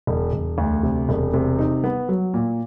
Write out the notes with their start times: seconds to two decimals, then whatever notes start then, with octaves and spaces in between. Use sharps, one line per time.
0.07 E1
0.33 E1
0.58 D2
0.83 C3
1.09 E1
1.34 C3
1.59 D#4
1.84 B3
2.09 F#3
2.34 A#2